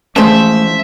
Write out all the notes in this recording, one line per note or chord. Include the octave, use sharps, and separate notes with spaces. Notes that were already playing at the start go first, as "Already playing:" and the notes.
E3 F3 G#3 A3 C#4 G#4 C5 E5